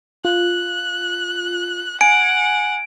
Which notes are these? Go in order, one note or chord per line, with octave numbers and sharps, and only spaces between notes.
F4 F#6
F#5 G#5 D7